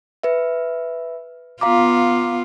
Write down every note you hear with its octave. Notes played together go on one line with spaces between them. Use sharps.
B4 E5
B3 F4 F5 A#5 D6